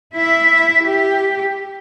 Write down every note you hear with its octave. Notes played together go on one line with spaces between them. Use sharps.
E4 E5
G4